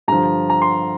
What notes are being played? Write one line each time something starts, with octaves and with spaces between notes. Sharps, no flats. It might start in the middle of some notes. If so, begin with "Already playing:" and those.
G2 D3 F3 A#5
A#5
C6